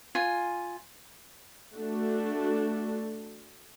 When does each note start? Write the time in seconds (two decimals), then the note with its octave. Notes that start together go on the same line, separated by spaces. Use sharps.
0.15 F4 G#5
1.75 A3 D4 F#4